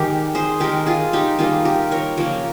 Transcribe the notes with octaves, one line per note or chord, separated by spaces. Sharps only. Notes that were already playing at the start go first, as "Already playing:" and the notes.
Already playing: D#3 G#3 G4 A#4
G#4 C5
D#3 G#3 G4 A#4
F4 G#4
D#4 G4
D#3 G3 A#3 F4 G#4
G4 A#4
A#4 C#5
C#3 F3 A#3 A#4 C#5